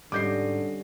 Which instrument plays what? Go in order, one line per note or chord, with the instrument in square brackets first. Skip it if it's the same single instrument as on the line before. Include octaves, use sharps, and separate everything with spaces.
[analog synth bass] G#2 [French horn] D3 [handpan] G3 C#4 D#5 [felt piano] D6 G6 C7